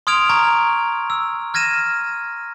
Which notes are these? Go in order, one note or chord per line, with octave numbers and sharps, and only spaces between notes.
C6 D#6 F6 G#6 D7 F7
A#5 C#6 G#6
E6
F6 G#6 A#6 D#7 E7